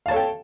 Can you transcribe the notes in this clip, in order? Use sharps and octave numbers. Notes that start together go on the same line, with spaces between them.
A4 C#5 F5 G5 A5